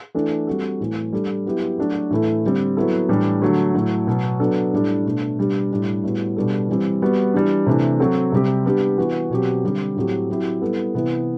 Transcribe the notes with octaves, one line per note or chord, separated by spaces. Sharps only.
E3 A3 D4 A4
G3 C4 F#4 A4
A2 E3 A3
G3 D4 A4
F#3 B3 E4 G4
F#3 A3 D4 F#4 A4
A2 E3 A3 E4 A4
D3 G3 C4
F#3 B3 E4 A4
A2 E3 G3 D4 G4
D3 F#3 A3
A2 F#3 A3
B2 F#3 B3
F#3 B3 D4 A4
A2 G3 D4 A4
B2 A3 D4
B2 G3 D4 G4
A2 G3 D4 G4
A2 G3 B3 F#4
B2 G3 D4 F#4 A4
E3 G3 C4
G3 B3 F#4
E3 G3 D4
C3 E3 A3 D4
F#3 C4 F#4 A4
C3 G3 C4 G4
G3 B3 D4 G4
E3 B3 F#4
B2 F#3 C4 G4
D3 G3 C4 G4
A2 F#3 C4 G4
F#3 C4 E4 G4
G3 B3 E4 A4
C3 E3 B3 E4